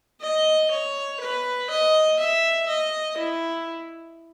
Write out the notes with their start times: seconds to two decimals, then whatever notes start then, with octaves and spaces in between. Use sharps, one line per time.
0.21 D#5
0.71 C#5
1.20 B4
1.70 D#5
2.19 E5
2.68 D#5
3.17 E4